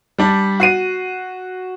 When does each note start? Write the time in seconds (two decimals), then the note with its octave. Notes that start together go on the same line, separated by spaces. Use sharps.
0.18 G3 D4
0.60 F#4 C7 D#7